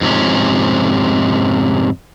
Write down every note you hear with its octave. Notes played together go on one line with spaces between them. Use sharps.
F2 G#2 C3 C#4